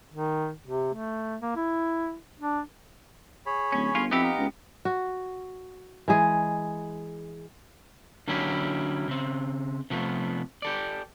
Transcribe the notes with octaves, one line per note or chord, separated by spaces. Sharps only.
D#3
C3
A3
A#3
E4
D4
G#4 C#5 B5
D1 C#4
G1 C#4 F4
F2 B3 D#4 E4 G4 E5 B5
D#5 F5 A#5
C#2
F#4
E3 G#3 G#4
D3 F#3 A#3 C#4 E4 G4
C#3 C4
C3 F3 A3 B3
G4 A4 D5